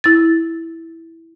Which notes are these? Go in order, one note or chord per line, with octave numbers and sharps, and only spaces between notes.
E4 A6